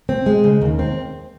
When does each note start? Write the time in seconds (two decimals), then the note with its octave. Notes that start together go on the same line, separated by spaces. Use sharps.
0.09 C4
0.26 G#3
0.44 C#3
0.62 D#2
0.79 C4